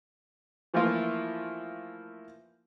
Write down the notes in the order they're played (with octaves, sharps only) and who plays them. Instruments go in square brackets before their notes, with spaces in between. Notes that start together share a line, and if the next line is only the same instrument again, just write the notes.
[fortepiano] E3 F3 A3 A#3 E4 F4